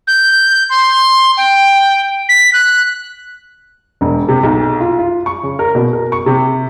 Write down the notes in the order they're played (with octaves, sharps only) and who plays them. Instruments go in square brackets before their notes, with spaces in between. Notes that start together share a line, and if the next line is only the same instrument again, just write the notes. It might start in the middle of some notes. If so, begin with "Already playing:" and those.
[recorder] G6
C6
G5
B6
F#6
[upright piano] E1
C3
B1
F4
F4
C#6
C#3
A#4
B2
A#4
C#6
C3